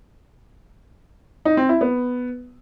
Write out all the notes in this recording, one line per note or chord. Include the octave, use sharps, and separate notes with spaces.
D#4
C4
E4
B3